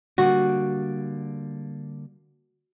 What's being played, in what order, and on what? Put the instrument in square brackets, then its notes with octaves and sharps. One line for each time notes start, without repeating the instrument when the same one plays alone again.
[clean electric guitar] D3 G3 A#3 [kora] F#4